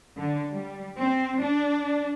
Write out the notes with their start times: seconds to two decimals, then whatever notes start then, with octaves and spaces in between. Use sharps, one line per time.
0.16 D3
0.52 G3
0.99 C4
1.40 D4